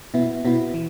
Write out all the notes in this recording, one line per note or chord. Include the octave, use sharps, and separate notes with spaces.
B2 B3 E4
B2 B3 E4
E3